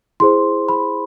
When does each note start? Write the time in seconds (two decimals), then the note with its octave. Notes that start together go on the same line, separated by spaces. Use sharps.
0.20 E4 G#4 C5 C6
0.69 B5